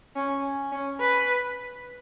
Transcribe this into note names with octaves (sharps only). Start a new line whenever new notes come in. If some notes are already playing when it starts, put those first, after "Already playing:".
C#4
C#4
B4